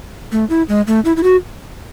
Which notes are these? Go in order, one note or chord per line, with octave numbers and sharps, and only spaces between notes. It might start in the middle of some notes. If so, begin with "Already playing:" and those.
A3
E4
G#3
A3
E4
E4
F#4